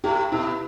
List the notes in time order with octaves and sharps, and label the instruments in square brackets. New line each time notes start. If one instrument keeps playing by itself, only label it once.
[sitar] A2 A3 [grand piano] G4
[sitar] B2 B3 [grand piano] E4